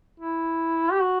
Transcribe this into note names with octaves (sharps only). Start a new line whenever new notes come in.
E4
G4
F#4